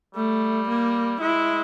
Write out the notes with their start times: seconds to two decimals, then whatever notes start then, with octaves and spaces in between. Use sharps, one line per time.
0.15 G3 A3
0.68 A#3
1.20 G#3 E4